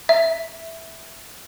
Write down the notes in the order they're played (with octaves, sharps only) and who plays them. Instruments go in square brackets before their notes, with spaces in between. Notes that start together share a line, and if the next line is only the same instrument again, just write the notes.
[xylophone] E5